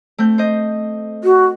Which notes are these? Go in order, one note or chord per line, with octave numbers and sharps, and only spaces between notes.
A3 C4 G6
C5 D#5
F#4